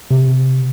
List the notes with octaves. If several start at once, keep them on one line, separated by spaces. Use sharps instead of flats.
C3